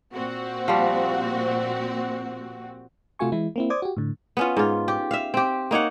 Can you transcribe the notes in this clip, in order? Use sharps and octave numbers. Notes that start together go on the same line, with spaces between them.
A#2 C4 F#4
F3 G3
C3 A3 F4 F#4 G#5 C#6
E3 G#3 E4
A#3 C4 E4
C5 D5 D6 D#6 G#6
F#4 G4
A2 D3
B3 C#4 F4
G#2 F4
G4
E5 F5
C4 G4
A#3 D#4 C#5 F#5